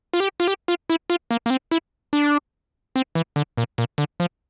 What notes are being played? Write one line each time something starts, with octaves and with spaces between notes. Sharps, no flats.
F4
G4
F4
G4
F4
E4
F4
A#3
A#3
C4
E4
D4
C4
E3
D3
A#2
A#2
D3
F3